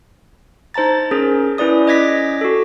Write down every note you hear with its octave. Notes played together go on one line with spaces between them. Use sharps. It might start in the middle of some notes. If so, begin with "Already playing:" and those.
D#4 C5 A5 A#5 A6
C#4 G#4 A#4
C#4 E4 B4 D5 D#6
C#4 D#5 D6 G#6 A#6 B6
F#4 A4